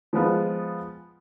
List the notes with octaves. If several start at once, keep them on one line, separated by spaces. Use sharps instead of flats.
F3 G#3 B3 F4